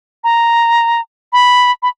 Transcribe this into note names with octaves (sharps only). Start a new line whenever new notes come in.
A#5
B5
B5